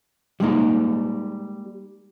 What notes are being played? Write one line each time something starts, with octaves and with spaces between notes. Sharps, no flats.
G3 G#3 A#3 D#4